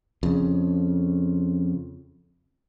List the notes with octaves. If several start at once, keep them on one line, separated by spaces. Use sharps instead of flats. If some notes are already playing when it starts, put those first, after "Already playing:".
F2 C#3